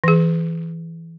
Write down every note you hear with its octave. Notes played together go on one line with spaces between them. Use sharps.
E3 G#4